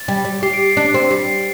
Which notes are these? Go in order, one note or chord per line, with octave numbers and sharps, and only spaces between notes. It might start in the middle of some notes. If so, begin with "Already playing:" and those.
Already playing: A6
G3
G3
G4 C7
D7
C7
D4
C4
G3 C7